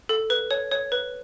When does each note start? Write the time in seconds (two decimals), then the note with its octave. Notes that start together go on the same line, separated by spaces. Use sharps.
0.09 A4
0.30 B4
0.51 C#5
0.71 C#5
0.92 B4